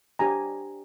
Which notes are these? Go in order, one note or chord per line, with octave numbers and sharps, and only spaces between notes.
D4 G4 C5 G#5 A#5